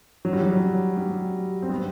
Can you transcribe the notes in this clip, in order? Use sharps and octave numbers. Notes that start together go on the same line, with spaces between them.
F#3
G3
F#3
G3
C4
G3 B3